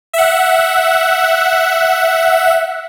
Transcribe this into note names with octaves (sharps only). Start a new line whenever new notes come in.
E5 F#5